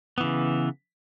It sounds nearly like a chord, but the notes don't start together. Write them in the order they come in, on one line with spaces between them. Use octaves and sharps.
B3 E3 C#3